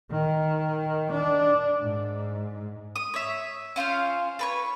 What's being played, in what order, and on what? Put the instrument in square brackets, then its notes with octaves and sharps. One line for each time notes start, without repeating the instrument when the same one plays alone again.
[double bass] D#3
D4
G#2
[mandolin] D#6
C#5 E5
C#4 F4 C5 F5
A4 B4 C#5